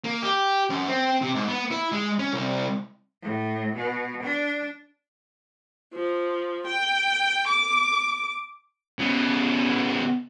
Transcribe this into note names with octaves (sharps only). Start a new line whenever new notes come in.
A#3
G4
F#2
C4
C3
G#2
B3
E4
G#3
C#4
C2
A2
B2
D4
F3
G5
D6
C#3 B3